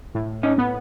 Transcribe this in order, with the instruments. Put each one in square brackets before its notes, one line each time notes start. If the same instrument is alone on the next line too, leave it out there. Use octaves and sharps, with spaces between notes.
[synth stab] A2
[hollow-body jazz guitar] C#4 D#4
[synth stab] B3